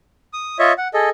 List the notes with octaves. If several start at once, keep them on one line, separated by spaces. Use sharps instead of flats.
D#6
F4 C#5 D#5 E5
F#5
G#4 A4 D#5